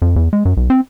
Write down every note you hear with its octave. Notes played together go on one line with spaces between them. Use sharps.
F2
E2
G#3
F#2
B1
C4